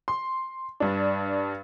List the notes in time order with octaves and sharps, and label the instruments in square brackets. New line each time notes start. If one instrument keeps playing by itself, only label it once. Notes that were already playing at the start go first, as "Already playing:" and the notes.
[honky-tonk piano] C6
G2 D4